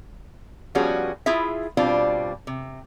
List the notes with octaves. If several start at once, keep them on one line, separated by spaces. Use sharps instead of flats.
F3 G3 B3 C#4 F#4 G#4
E4 F4 G#4 E5
B2 G3 C4 D4 F4
C3